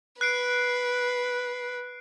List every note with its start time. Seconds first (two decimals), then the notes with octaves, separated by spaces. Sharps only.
0.21 B4 F#6 C7 D7